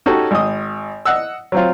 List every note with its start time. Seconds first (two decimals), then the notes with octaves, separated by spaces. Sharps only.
0.06 C#4 D#4 F#4 G4 A4 C#5
0.31 G#1 D#6
1.05 D#5 F#5 E6
1.52 F#3 C4 F4